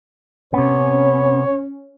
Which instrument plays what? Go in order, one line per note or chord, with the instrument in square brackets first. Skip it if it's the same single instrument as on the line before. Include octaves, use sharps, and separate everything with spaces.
[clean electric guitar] C3 B3 [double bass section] C#4 [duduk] C#5